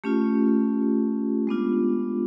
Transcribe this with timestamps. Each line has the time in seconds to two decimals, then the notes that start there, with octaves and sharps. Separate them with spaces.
0.04 A3 C#4 F4 G4
1.47 G#3 B3 D4 F4